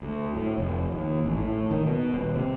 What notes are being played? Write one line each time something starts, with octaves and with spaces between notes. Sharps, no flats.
D2
A2
F1
D#2
A1
A2
D#3
B2
D#1
C3